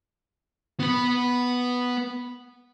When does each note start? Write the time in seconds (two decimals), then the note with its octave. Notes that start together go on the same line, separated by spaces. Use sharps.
0.80 B3 B4